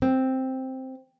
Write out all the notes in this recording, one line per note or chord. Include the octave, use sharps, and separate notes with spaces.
C4